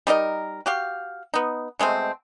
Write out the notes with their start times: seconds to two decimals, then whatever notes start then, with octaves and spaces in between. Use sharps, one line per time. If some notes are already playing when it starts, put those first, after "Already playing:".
0.07 G3 D#4 A#4 D#5
0.66 F#4 G4 F5
1.34 B3 D#4
1.79 B2 G#3 A3 C4